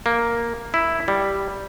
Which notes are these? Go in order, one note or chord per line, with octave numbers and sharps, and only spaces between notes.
A#3
E4
G3